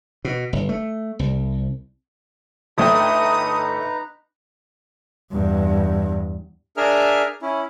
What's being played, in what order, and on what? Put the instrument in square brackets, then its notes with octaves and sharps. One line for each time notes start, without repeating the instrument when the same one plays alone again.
[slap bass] B2
G1
A3
C2
[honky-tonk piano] G1 A3 G5 [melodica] D#4 B4 A#5 [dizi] D#6
[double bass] E2 G2
[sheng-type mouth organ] D4 G#4 A#4 E5 F6
C#4 E4